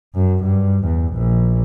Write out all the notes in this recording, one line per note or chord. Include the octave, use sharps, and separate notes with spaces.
F#2
G2
E2
A#1